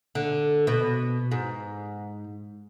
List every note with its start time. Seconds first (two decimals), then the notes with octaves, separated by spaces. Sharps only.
0.15 D3
0.67 B2
1.31 G#2